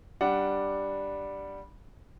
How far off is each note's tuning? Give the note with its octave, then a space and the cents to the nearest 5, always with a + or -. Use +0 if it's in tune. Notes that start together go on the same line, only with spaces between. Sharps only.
G3 +0 D4 +0 F#5 +0